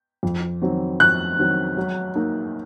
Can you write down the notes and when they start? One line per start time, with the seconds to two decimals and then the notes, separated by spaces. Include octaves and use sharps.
0.23 F2
0.62 D#3 F#3 C4
1.00 F2 F#6
1.38 D#3 F#3 C4
1.77 F#3
2.15 A#3 D#4